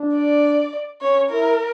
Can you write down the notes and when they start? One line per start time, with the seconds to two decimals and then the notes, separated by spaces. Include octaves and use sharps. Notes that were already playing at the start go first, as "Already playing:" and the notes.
Already playing: D4
0.15 D5
1.02 C#4 C#5
1.30 E4 A#4